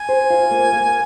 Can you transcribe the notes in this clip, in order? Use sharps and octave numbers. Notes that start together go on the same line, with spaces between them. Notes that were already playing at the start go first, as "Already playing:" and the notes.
Already playing: G#5
C5
F4
A#3
A#3